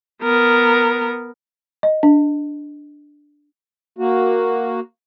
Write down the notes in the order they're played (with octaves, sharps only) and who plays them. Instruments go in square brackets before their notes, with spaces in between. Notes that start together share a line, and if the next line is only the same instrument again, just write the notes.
[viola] B3 A#4
[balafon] D#5
D4
[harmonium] A#3 F#4